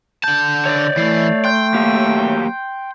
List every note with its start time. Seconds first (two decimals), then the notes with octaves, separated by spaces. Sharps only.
0.24 D3 A5 G6
0.65 C#5 D5
0.97 E3 A3 C7
1.45 G5 C6 F#6 G6
1.74 F#3 A#3 G4